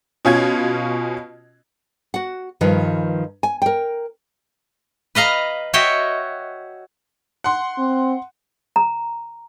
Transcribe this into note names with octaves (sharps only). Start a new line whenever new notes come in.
B2 C#4 F4 G#6
F#4 F#5
G2 D#3 F3 B4
G#5
A#4 G5
B4 D#5 F5 A#5
F#4 C#5 D#5 E5 G5
F#5 C6
C4
A#5